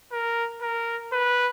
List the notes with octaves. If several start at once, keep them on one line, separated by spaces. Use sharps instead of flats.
A#4
A#4
B4